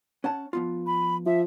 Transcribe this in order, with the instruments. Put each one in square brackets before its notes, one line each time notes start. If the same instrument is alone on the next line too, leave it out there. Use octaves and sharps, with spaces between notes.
[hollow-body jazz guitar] C#4 F#5 A5
F3 B3 F4
[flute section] B5
[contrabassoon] F3 [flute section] E5